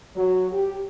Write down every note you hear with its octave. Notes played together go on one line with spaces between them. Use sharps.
F#3
G4